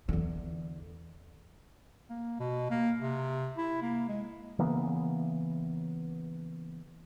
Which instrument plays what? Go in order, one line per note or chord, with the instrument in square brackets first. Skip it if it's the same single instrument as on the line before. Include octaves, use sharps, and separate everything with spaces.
[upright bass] E2 D3
[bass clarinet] A#3
B2
A#3
C3
E4
A#3
G#3
[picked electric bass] C#3 E3 A#3 B3